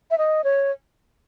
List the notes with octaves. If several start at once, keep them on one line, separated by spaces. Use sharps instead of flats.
E5
D#5
C#5